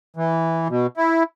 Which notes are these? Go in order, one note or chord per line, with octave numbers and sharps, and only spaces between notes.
E3
B2
E4